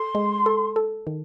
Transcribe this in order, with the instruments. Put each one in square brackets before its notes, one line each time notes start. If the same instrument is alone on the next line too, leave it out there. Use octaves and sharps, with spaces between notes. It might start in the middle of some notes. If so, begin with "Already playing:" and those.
Already playing: [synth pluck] A4 [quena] C6
[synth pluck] G#3
A4
A4
D#3